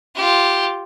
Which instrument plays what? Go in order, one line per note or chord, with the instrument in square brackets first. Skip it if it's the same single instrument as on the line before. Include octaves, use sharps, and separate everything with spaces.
[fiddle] F4 G4